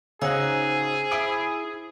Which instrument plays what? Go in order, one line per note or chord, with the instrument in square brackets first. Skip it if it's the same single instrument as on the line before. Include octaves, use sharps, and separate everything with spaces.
[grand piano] C#3 [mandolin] D#4 F#4 [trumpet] G#4 [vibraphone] C5 G#5 E6
[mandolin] E4 D#6 [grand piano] D7